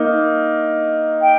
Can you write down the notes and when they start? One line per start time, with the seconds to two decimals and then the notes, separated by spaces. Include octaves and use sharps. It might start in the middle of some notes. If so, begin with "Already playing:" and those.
Already playing: A#3 D#4
1.22 G5